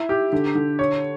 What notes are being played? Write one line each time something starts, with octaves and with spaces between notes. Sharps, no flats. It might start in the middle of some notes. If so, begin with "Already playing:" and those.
Already playing: E4
G4
D3
D3
C#5